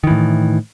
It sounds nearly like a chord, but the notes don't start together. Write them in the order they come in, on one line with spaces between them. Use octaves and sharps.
D#3 E3 A2